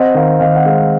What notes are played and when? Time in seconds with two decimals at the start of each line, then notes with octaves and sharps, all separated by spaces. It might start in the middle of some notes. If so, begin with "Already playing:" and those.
Already playing: C4 D#5 F#5
0.14 D#3 F5
0.40 D#3 F5
0.56 F#5
0.66 G#3 F5